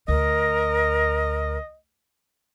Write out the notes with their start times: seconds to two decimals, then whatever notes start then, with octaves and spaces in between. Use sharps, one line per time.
0.08 D2 A#4 D#5